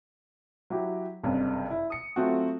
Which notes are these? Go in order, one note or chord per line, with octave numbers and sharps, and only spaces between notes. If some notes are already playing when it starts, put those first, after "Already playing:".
F#3 E4 G4
F#1 G2 C3 C#4
E4
D#6 C#7
F#3 A3 C4 F4 F#4